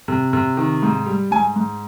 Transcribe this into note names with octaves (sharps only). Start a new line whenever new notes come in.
C3
C3
D#3
G#2
G3
G#2 G#5
G#2